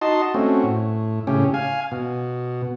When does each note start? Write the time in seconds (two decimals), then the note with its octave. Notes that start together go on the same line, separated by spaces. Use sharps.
0.02 D#4 F#4 D#5 A5 C6
0.34 A3 C4 C#4 F#4
0.64 A2
1.27 A2 C#3 C#4 G4
1.54 F5 G#5
1.92 B2